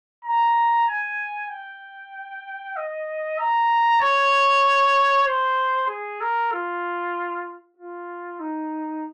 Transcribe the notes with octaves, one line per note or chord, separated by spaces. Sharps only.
A#5
G#5
G5
D#5
A#5
C#5
C5
G#4
A#4
F4
F4
D#4